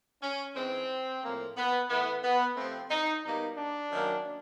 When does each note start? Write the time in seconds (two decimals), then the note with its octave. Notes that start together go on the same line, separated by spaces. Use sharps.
0.22 C#4
0.56 G#2 E3 G#3 C4
1.22 A2 F3 A#3
1.57 B3
1.89 A2 E3 A3 B3
2.23 B3
2.56 C3 F3 A3 C4
2.90 D#4
3.23 B2 G3 A#3 D#4
3.57 D4
3.90 F#2 D#3 F#3 A#3